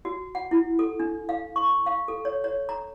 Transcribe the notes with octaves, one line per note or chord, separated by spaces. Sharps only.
F#4
F#5
E4
A4
D4
F5
C#6
F5
A4
C#5
C#5
A#5